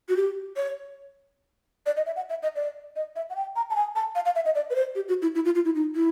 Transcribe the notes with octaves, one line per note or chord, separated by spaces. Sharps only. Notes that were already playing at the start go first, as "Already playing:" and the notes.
F#4
G4
C#5
D5
D#5
E5
F#5
E5
D#5
D5
D#5
E5
F#5
G5
A#5
A5
G#5
A5
F5
F5
E5
D#5
D5
B4
C5
G4
F#4
E4
E4
F4
F4
E4
D#4
E4